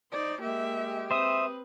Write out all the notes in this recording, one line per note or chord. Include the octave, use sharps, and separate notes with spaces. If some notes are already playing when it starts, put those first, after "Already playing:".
D#4 C5 D5
G#3 A#3 G4 E5
C4 B4 C5 E5 D#6